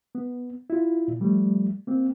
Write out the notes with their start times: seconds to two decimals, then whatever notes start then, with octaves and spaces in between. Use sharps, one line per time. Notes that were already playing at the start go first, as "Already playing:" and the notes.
0.15 B3
0.70 E4 F4
1.08 A#2
1.20 F3 G3 A3
1.87 A#3 C4